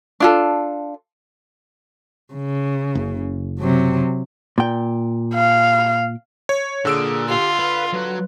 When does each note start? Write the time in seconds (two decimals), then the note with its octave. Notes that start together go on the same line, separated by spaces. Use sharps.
0.20 D4 F4 A4
2.34 C#3
2.95 F#1
3.58 C3 F#3
4.58 A#2 G5
5.35 F5
6.49 C#5
6.85 A#2 D3 G#4 E6 D7
7.28 F4 G4
7.59 B4 F5
7.93 F#3 B4 A#5